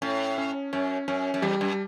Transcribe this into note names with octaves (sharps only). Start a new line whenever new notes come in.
A2 C#4
C#4
F#2 C#4
F#2 C#4
F#2
E2 G3
F#2